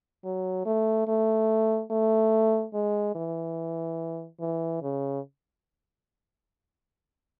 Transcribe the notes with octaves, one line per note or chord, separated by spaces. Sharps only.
F#3
A3
A3
A3
G#3
E3
E3
C#3